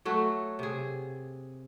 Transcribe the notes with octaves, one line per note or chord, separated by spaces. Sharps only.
F#3 A3 F#4
C3 G#4